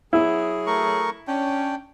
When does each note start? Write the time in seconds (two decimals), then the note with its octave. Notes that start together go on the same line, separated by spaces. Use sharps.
0.13 F#3 B3 E4 G#4
0.67 A3 A#4 C#6
1.28 C#4 D4 G5